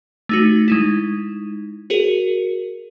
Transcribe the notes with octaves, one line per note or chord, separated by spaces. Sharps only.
A3 D#4 F#4
G#3 D#4 E4
F#4 G#4 A#4